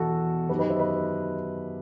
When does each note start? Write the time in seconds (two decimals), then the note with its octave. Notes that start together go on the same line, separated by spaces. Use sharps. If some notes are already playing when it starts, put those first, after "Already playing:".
Already playing: E2 B2 F#4 A4
0.49 F#2 D#3 G4 B4
0.59 B4 D#5
0.69 C5 E5
0.80 B4 D#5